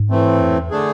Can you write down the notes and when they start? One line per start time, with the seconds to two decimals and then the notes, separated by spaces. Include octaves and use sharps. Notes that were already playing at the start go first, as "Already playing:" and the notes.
Already playing: G#2
0.10 A2 E3 A3 C4
0.40 F2
0.55 E2
0.70 D3 A3 D4 G#4